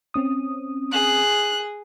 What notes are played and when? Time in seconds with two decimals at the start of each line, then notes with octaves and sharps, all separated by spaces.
0.14 C4 C#4 D#6
0.93 G#4 F#6